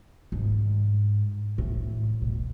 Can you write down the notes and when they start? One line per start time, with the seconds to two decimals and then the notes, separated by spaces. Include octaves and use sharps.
0.32 G#2
1.58 A2
2.22 B2